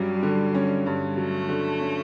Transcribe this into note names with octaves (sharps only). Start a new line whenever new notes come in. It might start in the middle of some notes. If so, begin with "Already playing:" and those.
Already playing: G2 F#3 G3 C#4
D3
C#4
G2
F#3 A3
D3
C#4